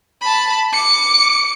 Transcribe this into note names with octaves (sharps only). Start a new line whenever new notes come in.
A5 B5
D6 C#7